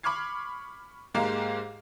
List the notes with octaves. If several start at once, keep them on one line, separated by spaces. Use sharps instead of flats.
B5 C#6 D6 F6 G#6 C7
G#2 G#3 A#3 G4 F5 A#5